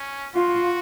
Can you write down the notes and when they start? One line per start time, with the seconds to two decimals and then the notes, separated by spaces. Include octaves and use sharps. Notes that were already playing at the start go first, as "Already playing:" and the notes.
Already playing: C#4
0.35 F4 F#4